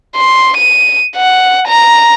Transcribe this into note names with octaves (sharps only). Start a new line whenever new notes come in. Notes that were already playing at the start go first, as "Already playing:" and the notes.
C6
D#7
F#5
A#5